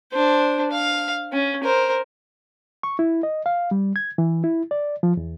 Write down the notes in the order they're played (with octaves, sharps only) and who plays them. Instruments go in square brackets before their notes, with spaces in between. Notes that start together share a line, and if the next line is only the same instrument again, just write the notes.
[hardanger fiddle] D4 C5
F5
C#4
A#4 C5
[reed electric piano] C#6
E4
D#5
F5
G3
G#6
E3
E4
D5
F3
E2